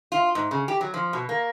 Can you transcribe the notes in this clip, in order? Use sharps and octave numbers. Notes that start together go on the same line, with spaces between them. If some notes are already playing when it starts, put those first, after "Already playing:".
F4
G#2
C#3
G4
F#3
F3
B2
A#3